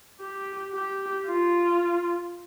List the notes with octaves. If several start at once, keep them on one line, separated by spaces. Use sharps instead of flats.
G4
G4
F4